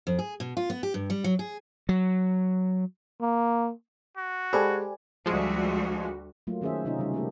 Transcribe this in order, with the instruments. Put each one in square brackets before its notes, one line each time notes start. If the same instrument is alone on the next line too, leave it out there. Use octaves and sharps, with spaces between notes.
[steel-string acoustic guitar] F2
G#4
B2
F4
B3
G4
G2
G3
F#3
G#4
[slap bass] F#3
[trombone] A#3
[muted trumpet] F#4
[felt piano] G#3 A5 [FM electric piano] G4 D5 G#5 [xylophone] A4 C5 B5
[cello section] D2 G3 F#4 [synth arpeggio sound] F3 G#3
[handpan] F#3 A3 A#3 F4
D#3 C#4 G#4 C5 E5
C3 C#4 D#4 F4
C#3 G3 D#4
A3 A#3 F4 G4 A4